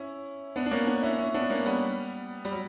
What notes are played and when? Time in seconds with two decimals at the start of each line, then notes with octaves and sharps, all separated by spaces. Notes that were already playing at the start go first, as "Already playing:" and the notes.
Already playing: C#4 E4
0.56 B3 D4
0.66 D4
0.71 A#3 C#4
0.87 B3 D4
1.03 C#4 E4
1.18 C#4 E4
1.34 B3 D4
1.50 A#3 C#4
1.66 G3 B3
2.45 G3
2.52 F#3